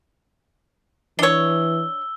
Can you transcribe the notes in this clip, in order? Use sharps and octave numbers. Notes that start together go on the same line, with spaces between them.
E3 D4 C#5 E6 G7